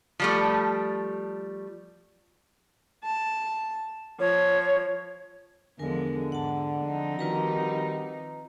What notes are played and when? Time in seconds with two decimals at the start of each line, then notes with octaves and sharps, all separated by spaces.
0.20 F3 G3 A3
3.04 A5
4.20 F3 C#5
5.79 E2 D3 F3 G#3 A#4 G#5
6.32 G#2 F#5 A5
6.84 F3 C4 D#4
7.19 D#3 G3 F4 F#4 B4 A#5